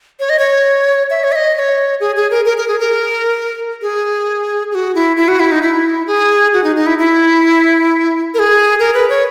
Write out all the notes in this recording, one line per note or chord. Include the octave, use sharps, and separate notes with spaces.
C#5
D#5
C#5
E5
C#5
E5
D#5
D#5
C#5
G#4
G#4
A#4
A#4
A#4
G#4
A#4
G#4
G#4
F#4
E4
E4
F#4
E4
D#4
E4
G#4
F#4
D#4
D#4
E4
E4
A#4
G#4
A#4
B4
C#5